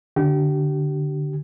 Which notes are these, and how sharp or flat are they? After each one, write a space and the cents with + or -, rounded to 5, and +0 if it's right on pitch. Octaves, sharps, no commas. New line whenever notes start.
D3 +0 G4 -35